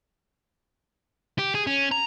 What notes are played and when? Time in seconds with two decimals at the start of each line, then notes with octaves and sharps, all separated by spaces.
1.39 G4
1.55 G#4
1.67 C#4
1.92 A#5